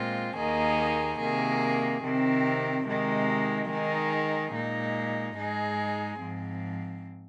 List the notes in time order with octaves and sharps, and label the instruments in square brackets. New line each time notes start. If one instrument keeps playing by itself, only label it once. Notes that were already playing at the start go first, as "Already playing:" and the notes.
Already playing: [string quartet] A#2 G#3 C4 F4
D#2 D#3 A#3 D#4 G#4
C3 D#3 A#3 G#4
C3 D#3 C4
C3 D#3 G#3 D#4
D#3 G#3 D#4 G#4
A#2 G#3 D#4
G#2 G#3 D#4 G#4
G#2 F3 C4